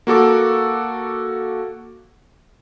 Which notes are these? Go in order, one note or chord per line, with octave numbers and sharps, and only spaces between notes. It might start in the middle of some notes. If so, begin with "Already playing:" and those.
A#3 F#4 A4 D6